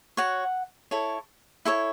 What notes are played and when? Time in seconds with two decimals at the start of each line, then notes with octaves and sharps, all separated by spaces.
0.17 F#4 C#5 F#5
0.91 E4 A4 C#5
1.65 E4 A4 C#5 E5